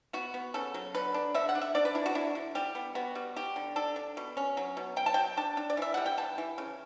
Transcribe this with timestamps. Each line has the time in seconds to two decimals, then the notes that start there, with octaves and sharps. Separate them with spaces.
0.13 B3 F#4
0.34 B3
0.54 C#3 A4
0.74 F#3
0.94 D3 B4
1.14 D4
1.35 D3 E5
1.49 F#5
1.55 D4
1.61 E5
1.75 D4 D5
1.85 B4
1.95 D4 E4
2.06 F#4
2.15 D4 E4
2.35 D3
2.55 G3 G4
2.75 B3
2.95 B3 F#4
3.15 G3
3.36 G3 G4
3.56 D3
3.76 D4 A4
3.96 D4
4.17 B2
4.37 C#4
4.57 F#3
4.77 B2
4.96 F#3 G5
5.06 A5
5.14 F#3 G5
5.37 D4 A5
5.57 D4
5.70 D5
5.77 E3 E5
5.94 G3 F#5
6.06 G5
6.17 E3 A5
6.38 E3
6.58 C#3